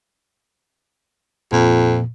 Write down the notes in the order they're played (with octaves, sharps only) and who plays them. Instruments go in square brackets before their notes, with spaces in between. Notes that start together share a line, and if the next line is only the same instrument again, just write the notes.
[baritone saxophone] F2 [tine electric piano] A#2